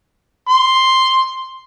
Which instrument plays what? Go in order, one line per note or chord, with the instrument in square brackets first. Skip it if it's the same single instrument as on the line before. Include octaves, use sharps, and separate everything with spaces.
[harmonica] C6